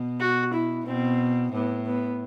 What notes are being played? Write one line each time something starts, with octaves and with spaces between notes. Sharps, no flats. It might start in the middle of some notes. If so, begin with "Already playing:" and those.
Already playing: B2
F#4
E4
B2 C4
A2 B3
B3